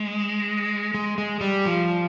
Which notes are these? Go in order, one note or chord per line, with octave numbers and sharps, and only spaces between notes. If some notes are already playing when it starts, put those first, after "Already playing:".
Already playing: G#3
G#3
G#3
G3
F3